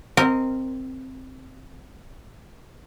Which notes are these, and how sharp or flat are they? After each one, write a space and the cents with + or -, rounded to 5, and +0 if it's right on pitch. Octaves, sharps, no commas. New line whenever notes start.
C4 +0 A#4 -15 D#5 +0